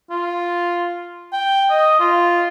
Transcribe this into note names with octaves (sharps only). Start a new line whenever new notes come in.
F4
G5
D#5
F4